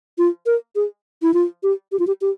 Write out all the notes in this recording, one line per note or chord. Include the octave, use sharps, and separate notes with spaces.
F4
A#4
G#4
E4
F4
G4
G4
F4
G4
G4